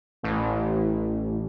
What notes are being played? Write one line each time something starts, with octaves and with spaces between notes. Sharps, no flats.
A1